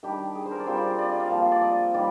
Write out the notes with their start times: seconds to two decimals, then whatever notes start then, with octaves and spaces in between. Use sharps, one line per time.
0.03 D#3 G3 D4 G4
0.35 G#4
0.46 C5
0.51 A#4
0.60 D5
0.67 G3 C4 F4 C5
0.77 D5
0.87 C5
0.98 D5
1.09 D#5
1.20 F5
1.30 F3 A#3 F4
1.52 D5
1.62 D#5
1.94 D#3 G3 D5